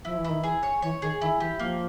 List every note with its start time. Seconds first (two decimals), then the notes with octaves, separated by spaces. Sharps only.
0.05 F3 E4
0.17 E3
0.24 E4
0.30 D#3
0.41 E3 G#4
0.63 C#5
0.82 E3 C#5
1.02 D#3 G#4
1.21 D#3 E4
1.37 F3
1.40 E3 G4
1.59 F3 A#3